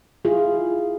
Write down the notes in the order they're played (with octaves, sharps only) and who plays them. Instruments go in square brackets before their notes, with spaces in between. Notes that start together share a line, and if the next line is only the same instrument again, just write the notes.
[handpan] E4 F4 G#4